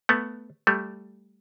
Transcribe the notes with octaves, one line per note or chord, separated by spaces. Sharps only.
A3 B3
G3 A3